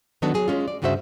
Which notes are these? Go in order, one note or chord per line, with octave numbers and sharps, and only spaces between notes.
D#3 F#3 B3 D4 F#4 A4
F#3 G#4
G#3 C#4 F4
D5
D2 G2 C#3 F#4 C5 E5